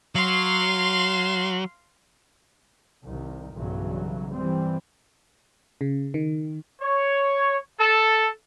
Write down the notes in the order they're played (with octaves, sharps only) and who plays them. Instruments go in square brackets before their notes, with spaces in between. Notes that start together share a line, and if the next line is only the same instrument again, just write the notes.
[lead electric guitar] F#3 [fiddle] F5 C6
[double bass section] C2 D#3
B1 G2 C#3 E3 F#3
E3 G3 C4
[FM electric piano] C#3
D#3
[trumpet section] C#5
A4